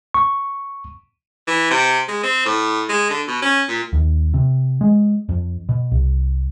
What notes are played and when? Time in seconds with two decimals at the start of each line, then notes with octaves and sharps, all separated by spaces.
0.14 C#6
1.47 E3
1.70 C3
2.08 G#3
2.23 C4
2.46 A2
2.89 G#3
3.10 D3
3.28 B2
3.42 C#4
3.68 A#2
3.93 D#2
4.34 C3
4.81 G#3
5.29 F2
5.69 B2
5.91 C2